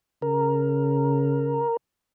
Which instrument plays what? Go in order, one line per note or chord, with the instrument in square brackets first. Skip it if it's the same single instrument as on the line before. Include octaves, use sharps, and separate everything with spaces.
[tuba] C#3 [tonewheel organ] A#4